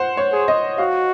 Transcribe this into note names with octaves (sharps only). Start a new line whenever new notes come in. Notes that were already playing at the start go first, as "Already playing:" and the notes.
Already playing: C5 F#5
C#5
G#4
D#5
F#4 F5